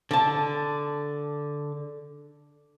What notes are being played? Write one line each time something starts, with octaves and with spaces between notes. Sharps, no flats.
D3 A5